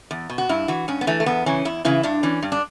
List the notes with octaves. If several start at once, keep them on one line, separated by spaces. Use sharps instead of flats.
E2
B2
F#4
G2 E4
E3 F#4
G2 C#4
B3
E3 A3
A3
E2 B3
C#3 E3 C#4
E2 E4
C#3 E3 E4
G2 D4
E3 C#4
G2
D4